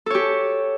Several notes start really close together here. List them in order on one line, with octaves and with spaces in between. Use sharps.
A4 C#5 G4